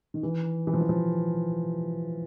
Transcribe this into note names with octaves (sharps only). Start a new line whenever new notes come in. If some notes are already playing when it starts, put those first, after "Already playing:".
D#3
E3
E3
F3
E3
F3